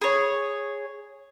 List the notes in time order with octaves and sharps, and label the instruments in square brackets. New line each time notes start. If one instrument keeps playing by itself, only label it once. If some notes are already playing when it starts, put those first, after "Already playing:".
[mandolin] G#4 C#5